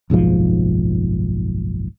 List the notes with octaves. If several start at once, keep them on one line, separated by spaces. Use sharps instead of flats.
F#1 B1 G#2 F3